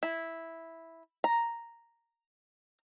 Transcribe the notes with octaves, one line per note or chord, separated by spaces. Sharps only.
E4
A#5